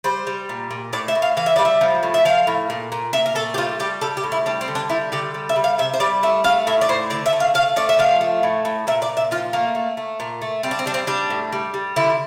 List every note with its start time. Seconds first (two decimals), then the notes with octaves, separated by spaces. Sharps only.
0.04 G3 C5
0.27 G3
0.49 A#2
0.71 A#2
0.93 A2 D5
1.08 E5
1.15 A2
1.22 F5
1.37 E3 F5
1.46 E5
1.56 G3 D5
1.65 E5
1.81 F3
2.03 A2
2.14 E5
2.25 F3 F5
2.47 A2
2.70 A#2
2.92 A#2
3.13 A#2 E5
3.26 A#4
3.35 A3 A4
3.54 G4
3.58 G3 F4
3.80 G3 G4
4.01 G3 A4
4.17 G4
4.23 A2
4.32 E4
4.46 G3 D4
4.61 C4
4.68 D3
4.75 D4
4.90 G3 E4
5.12 D3 G4
5.34 G3
5.49 E5
5.56 G3
5.64 F5
5.78 C3 E5
5.94 C5
6.00 G3 D5
6.23 A3 E5
6.44 A3 F5
6.67 A2 E5
6.81 D5
6.89 A2 C5
7.10 D3 D5
7.26 E5
7.33 A3
7.40 F5
7.54 A3 F5
7.76 A3 D5
7.89 E5
7.99 F3 F5
8.21 A3
8.43 A2
8.65 A2
8.87 A#2 E5
9.02 D5
9.09 A#2
9.17 E5
9.31 F3 F4
9.53 A3 A#3
9.75 A3
9.97 A3
10.20 A#2
10.42 A3
10.63 G3 C4
10.71 D4
10.79 C4
10.86 G3 D4
10.94 C4
11.07 G3 D4
11.30 A2
11.52 G3
11.74 G3
11.96 D3 E4